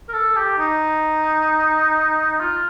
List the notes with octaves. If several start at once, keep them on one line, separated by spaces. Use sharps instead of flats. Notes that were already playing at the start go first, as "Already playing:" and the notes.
A#4
A4
G4
D#4
F4